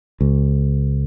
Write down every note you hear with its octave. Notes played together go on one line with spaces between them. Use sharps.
C#2